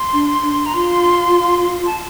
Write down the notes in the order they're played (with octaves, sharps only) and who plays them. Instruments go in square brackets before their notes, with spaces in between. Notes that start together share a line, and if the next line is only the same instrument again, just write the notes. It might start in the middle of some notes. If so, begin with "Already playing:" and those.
Already playing: [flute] C6
[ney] D4
D4
[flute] A#5
[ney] F4 [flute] C6
[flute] A5